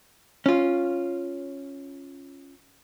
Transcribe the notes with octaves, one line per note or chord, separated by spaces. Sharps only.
C#4 F4